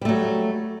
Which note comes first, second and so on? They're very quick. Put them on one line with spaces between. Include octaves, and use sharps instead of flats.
G3 A3 F#3